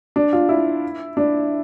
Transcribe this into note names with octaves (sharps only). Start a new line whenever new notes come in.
D4
F4
E4
D4